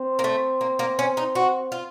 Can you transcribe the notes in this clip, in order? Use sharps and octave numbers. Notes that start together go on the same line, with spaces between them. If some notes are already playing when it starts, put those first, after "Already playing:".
Already playing: C4
A#3
A3
A#3
A#3
C#4
D#4
F#4
F4